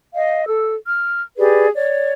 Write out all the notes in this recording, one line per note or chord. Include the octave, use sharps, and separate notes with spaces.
D#5 F5
A4 E6
F6
G4 G#4 B4 D5
C#5 D5